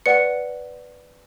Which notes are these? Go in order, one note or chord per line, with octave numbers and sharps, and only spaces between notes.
B4 D5 F#5 C#7